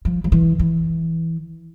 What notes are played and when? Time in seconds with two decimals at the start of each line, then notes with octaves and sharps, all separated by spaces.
0.05 F3
0.24 F3
0.32 E3
0.59 E3